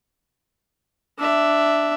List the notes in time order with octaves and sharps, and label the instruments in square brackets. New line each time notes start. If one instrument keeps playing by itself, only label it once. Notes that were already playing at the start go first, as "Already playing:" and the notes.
[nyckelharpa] D4 E5